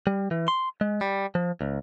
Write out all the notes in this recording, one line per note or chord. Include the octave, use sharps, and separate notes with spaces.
G3
E3
C6
G#3
G3
F3
C#2